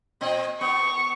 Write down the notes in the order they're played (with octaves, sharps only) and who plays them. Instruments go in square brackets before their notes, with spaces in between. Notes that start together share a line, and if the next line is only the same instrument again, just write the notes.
[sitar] A#2 C4 D#5
[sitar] B3 [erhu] C#6